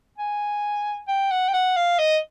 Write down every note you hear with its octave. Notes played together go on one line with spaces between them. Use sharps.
G#5
G5
F#5
G5
F#5
F5
D#5